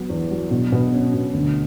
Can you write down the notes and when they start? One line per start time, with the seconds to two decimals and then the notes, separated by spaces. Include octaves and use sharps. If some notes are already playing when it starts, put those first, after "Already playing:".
Already playing: F#3 B3
0.10 E2
0.31 F#3
0.51 B2
0.72 B2
0.94 C#4
1.14 B2
1.34 D2